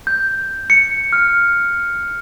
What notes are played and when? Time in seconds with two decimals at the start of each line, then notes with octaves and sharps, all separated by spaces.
0.07 G6
0.70 C#7
1.13 F6